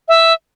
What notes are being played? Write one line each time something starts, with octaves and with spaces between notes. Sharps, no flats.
E5